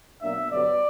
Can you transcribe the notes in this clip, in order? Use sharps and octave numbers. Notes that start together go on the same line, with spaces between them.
B2 F#3 A#3 D4 E5
G2 D3 F#3 B3 D5